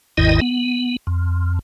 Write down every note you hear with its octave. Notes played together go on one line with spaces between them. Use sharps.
G1 D#2 G#2 D#3 E4 D#5
B3
F2